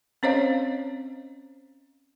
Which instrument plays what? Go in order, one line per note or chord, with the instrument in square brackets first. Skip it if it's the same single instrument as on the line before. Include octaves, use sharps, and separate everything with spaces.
[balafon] C4 C#4 C5 C#5 D#5 F5